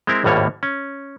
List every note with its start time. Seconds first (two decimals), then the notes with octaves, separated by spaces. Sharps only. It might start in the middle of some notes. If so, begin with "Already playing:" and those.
0.07 G#3 C4 E4 A#4
0.24 G#1 D#2 A2 G3 A#3 C#5
0.63 C#4